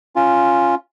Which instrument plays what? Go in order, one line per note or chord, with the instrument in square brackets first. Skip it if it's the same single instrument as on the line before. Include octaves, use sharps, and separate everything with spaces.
[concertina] C#4 F4